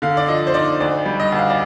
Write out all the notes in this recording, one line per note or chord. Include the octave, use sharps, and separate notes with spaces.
D3 F5
D5
F3 D#5
C5
D#4 D5
D2 D5
G3
D#5
D2
F5
D5